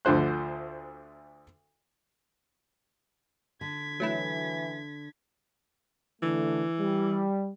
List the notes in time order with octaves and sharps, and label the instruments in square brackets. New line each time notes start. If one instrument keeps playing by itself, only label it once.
[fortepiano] D2 D3 F3 C5 F#6
[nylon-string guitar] D3 [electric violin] G#6 B6
[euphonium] E3 [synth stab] F#3 A3 E4
[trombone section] D3 A3 [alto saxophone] E3
[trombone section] G3